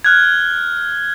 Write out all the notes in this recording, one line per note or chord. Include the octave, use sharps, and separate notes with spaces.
F6 F#6 G#6